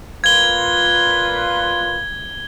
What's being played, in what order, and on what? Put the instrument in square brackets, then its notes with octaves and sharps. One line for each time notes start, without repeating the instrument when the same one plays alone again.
[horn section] A#2 F4 B4 [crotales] G#6 G7